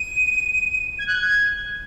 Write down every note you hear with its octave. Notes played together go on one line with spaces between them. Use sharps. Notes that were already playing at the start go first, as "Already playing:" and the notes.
Already playing: D#7
G#6
F#6
G#6